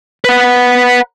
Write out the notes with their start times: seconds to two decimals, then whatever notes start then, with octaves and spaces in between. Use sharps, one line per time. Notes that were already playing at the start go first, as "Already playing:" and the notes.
0.25 B4 F#5